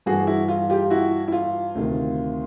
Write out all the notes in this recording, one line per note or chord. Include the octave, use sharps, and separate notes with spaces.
G2 E3 F#4 G#4
E4 F#4
F4
F4 G4
E4 F#4
E4
F4
D2 C3 D#3